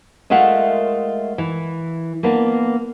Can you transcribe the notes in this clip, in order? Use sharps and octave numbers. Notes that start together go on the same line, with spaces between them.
G#3 A3 F4 A#4 E5 F#5
E3
A#3 B3 D4